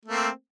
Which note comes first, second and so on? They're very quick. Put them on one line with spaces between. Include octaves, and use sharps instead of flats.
A3 A#3 C4